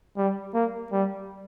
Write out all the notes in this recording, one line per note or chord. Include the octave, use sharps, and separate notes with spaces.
G3
A#3
G3